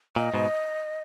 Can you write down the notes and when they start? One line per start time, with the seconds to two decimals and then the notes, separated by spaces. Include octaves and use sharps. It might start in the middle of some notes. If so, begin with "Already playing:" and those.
0.16 A#2 D#5
0.34 G#2 B2